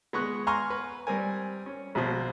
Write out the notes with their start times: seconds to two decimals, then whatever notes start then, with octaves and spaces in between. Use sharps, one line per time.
0.13 G#3 B3 C#6 F#6
0.47 F#5 G#5 A#5 C6 C#6 F6
0.70 B4
1.07 G3 C4 A#4 G#5
1.66 C#4
1.95 A#1 B2 C5